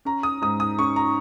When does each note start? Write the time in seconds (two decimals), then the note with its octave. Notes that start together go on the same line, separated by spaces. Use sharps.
0.05 C#4 A#5
0.23 D#6
0.42 G#2 D#6
0.60 D#6
0.79 C#4 C#6
0.96 A#5